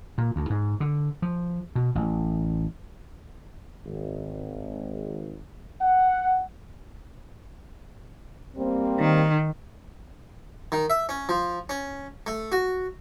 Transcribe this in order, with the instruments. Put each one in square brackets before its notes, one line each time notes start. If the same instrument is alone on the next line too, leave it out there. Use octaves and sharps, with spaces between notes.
[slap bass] A#2
D2
G#2
D3
F3
B2
A1
[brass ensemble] G#1
F#5
[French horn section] G3 A#3 C4
[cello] D#3
[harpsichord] D#3
E5
C#4
F3
C#4
A3
F#4